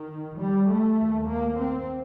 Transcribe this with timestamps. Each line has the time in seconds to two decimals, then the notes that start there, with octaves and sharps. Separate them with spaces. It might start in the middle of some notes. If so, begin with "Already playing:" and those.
Already playing: D#3
0.40 G3
0.69 A3
0.98 D#2
1.28 A#3
1.58 C4